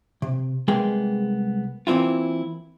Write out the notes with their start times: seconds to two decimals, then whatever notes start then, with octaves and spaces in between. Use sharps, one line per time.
0.22 C3
0.68 C2 G#3 A#3 B3 G#4 G5
1.87 E3 A#3 C4 E4 F4